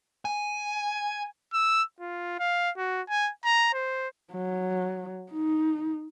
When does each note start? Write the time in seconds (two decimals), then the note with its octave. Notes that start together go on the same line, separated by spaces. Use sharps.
0.25 G#5
1.53 E6
2.00 F4
2.39 F5
2.77 F#4
3.09 G#5
3.45 A#5
3.74 C5
4.32 F#3
5.32 D#4